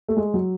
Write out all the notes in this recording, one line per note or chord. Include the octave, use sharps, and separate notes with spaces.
A3
G#3
F#3